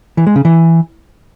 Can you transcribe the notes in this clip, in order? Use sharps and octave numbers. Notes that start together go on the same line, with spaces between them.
E3
G#3
C#3
E3